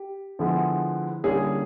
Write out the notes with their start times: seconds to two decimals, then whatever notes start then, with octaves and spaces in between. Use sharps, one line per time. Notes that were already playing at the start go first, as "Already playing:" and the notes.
Already playing: G4
0.39 D3 F3 G#3 B3 E4
1.24 D3 G3 A#3 C#4 E4 G#4